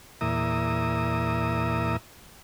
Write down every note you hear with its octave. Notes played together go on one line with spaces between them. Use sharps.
E2 A#2 E5 A#5 D#6